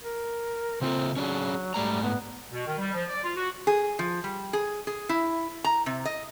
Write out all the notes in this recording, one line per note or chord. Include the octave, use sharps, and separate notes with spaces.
A#4
C#3 C4 F4 A4
F#3 C#4 D4 G#4
G#2 G3 A3 A#5
B3
B2
D#3
G3
F3
D5
F4
F#4
G#4
F3
G3
G#4
G#4
E4
A#5
C3
D#5